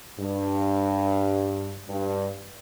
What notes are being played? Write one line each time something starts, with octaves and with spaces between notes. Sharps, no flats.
G2
G2